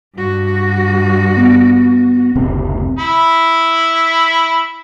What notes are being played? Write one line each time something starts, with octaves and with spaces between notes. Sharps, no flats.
G2 F#4
B3
F#1 D2 C3
E4 B5